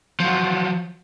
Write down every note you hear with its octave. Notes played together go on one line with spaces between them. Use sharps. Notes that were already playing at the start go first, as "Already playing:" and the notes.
F3 F#3